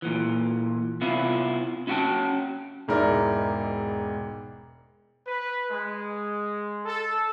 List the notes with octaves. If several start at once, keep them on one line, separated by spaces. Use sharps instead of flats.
A#2 E3
C3 B3 E4 F4
C#4 E4 F#4 D5 G5 A5
E1 G#2 E4 A#4 D5
B4
G#3
A4